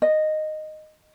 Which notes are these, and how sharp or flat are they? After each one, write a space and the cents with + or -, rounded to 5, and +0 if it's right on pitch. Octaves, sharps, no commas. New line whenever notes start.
D#5 -10